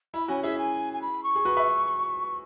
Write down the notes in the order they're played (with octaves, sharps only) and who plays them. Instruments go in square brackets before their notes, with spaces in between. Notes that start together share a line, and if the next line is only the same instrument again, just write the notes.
[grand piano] E4 [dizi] B5
[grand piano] C#4 F#4 [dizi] G#5
[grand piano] E4 G#4 [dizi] E5
[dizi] G#5
G#5
B5
C#6
[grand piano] G#4
F#4 B4
B4 E5